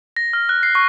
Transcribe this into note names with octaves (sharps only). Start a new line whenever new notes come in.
A#6
F6
F#6
C7
C#6